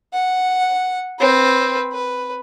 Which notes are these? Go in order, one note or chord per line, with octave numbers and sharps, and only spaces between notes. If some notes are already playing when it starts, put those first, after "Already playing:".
F#5
C4 B4
B4